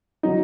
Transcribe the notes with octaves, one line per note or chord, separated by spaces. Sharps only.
D3 F#3 D#4